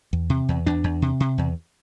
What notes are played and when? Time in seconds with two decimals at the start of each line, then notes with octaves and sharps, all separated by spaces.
0.13 E2
0.30 C3
0.48 E2
0.66 E2 D4
0.84 E2
1.02 C3
1.20 C3
1.38 E2